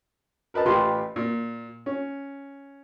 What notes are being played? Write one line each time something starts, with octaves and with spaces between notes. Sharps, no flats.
A#4 B4 D#5 A5
A1 F4 G4 B4 C6
A#2
C#4